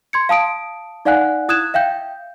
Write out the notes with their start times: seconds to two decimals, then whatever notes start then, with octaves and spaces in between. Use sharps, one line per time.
0.13 C6 G#6 C#7
0.29 F5 A5 D#6 D7
1.05 D#4 D5 F5 F#5 G#5 F#6
1.49 E4 D#6 F#6 G#6 E7
1.74 E5 F5 G5 G6